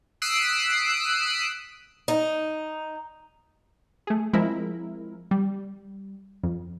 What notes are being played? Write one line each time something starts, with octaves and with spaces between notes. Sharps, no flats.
D#6 E6 F#6 B6 C7 D7
D#4
A3 G#4
F3 G#3 C4 E4 A#4
G3
F2